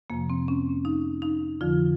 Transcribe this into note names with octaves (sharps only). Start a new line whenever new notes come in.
F2 C3 F3 A#3
C4
C#4
D#4
D#4
F2 D3 F3 F4